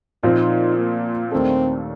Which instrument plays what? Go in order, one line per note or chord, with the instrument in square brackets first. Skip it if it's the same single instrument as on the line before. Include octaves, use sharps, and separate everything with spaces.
[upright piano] A#2 F3 C4 [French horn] D#4
[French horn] A#3
[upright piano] D#2 D#3 A3 D4 A4 [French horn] C4